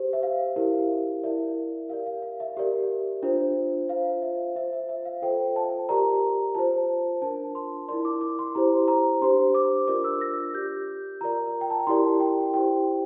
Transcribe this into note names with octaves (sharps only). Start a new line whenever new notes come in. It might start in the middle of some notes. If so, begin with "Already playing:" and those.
Already playing: G4 C5
E5
F5
E4 G4 A#4
E4 A#4 D5 E5
G4 A#4 D5 F5
F5
F5
E5
G4 A#4 D5
D4 F4 C5
F4 C5 F5
E5
F4 C5 E5
E5
E5
F5
F4 A4 C5 G5
A5
G4 A#4 D5 A#5
F4 C5 A5
D4 F4 A#4 A5
C6
E4 A#4 D5 C6
D6
D6
C6
E4 G4 C5 A#5
A#5
D4 G4 C5 C6
D6
D4 F4 A#4 D5 D6
E6
A#6
G4 D5 G6
F4 A#4 D5 A#5
G5
A5
A#5
E4 G4 A#4 D5 C6
G5
E4 G4 C5 G5